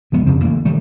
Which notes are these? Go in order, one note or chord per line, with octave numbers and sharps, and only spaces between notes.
D2 F3 G#3 B3
F2 C#3 C4
E3 A3 A#3
D3 D#3 G3 A3